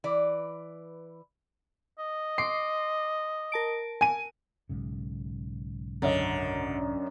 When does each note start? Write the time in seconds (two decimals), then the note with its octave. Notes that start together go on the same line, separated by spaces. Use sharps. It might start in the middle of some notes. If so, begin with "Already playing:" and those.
0.04 E3 B4 D5
1.99 D#5
2.38 C6 D6 C7
3.52 A#4 A5 D7
4.01 G#5 D#7
4.69 B1 G#2 C#3
6.02 F#2 D3 C#4 D#5